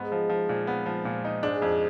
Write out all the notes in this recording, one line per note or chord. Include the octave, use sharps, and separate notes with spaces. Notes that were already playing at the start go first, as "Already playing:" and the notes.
Already playing: G#2 B3
F3
F3
A#2
B3
F3
A#2
D#4
G#2 D4
F2